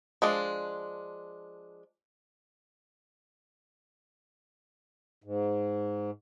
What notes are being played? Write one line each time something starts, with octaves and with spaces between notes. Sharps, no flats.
F3 G#3 D4
G#2